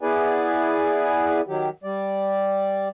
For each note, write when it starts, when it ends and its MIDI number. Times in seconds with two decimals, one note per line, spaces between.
0.01 1.41 59
0.01 1.41 64
0.01 1.41 68
0.01 1.41 71
0.01 1.41 74
0.01 1.41 80
1.48 1.69 51
1.48 1.69 54
1.48 1.69 67
1.84 2.88 55
1.84 2.88 74